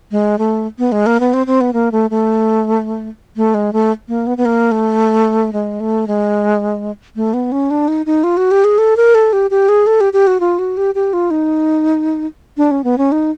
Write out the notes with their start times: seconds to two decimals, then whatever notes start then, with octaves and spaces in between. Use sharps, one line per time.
0.11 G#3
0.38 A3
0.79 B3
0.92 G#3
1.06 A#3
1.20 B3
1.34 C4
1.47 C4
1.61 B3
1.73 A#3
1.92 A3
2.11 A3
3.36 A3
3.54 G#3
3.73 A3
4.08 A#3
4.27 B3
4.37 B3
4.45 A#3
4.72 A3
5.53 G#3
5.80 A3
6.07 G#3
7.16 A3
7.34 B3
7.52 C#4
7.71 D4
7.88 D#4
8.06 D#4
8.24 F4
8.37 F#4
8.51 G4
8.64 G#4
8.78 A4
8.97 A#4
9.15 A4
9.33 G4
9.51 G4
9.69 G#4
9.87 A4
10.01 G4
10.13 G4
10.27 F#4
10.40 F4
10.59 F#4
10.77 G4
10.95 G4
11.13 F4
11.31 D#4
12.57 D4
12.71 C#4
12.84 B3
12.98 C#4
13.12 D#4